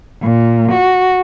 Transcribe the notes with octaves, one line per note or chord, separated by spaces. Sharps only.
A#2
F#4